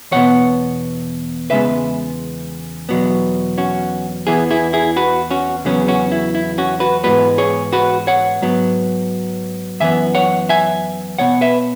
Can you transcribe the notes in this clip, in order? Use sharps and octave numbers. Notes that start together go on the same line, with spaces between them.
E2 B2 B3 C#5 F#5
E2 C#3 G#3 B3 B4 E5
E2 B2 F#3 B3
C#4 F#4
E2 E3 B3 E4 G#4
E4 G#4
E4 G#4
F#4 B4
C#4 F#4
E2 C#3 F#3 B3 C#4
C#4 F#4
E4
E4
C#4 F#4
F#4 B4
G#2 E3 G#3 B3 F#4 B4
G#4 C#5
F#4 B4
C#5 F#5
G#2 F#3 B3
F#2 E3 B3 E5 G#5
C#5 F#5
E5 G#5
B2 B3 C#5 F#5
B4 E5